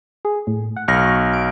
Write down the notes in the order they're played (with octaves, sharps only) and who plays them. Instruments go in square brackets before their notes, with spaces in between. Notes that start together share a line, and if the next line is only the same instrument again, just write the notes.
[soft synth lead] G#4
A2
F#5
[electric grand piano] B1 F6 A#6 [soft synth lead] C#6
[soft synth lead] D7